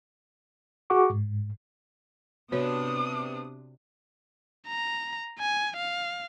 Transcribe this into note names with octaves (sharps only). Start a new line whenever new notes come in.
F#4 G#4 F#5 C#6 D6
G#2
C3 B3 D4 F#4 C#5 D#6
A#5
G#5
F5